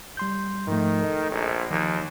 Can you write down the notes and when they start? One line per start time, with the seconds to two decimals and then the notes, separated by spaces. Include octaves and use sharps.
0.17 G3 C6 G6
0.68 G#2 D#3 F3 A3
1.02 A4 D#5
1.32 A#1
1.71 D#2 D#3 F3